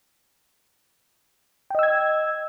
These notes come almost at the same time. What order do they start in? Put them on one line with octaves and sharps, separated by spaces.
G5 D#5 E6 G#6